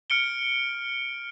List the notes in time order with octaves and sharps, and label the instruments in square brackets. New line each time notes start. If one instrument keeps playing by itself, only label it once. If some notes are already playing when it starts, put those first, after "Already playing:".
[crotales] F6 C#7 D7 G7